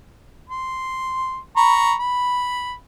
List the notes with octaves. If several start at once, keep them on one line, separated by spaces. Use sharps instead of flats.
C6
A#5 B5 C#6
B5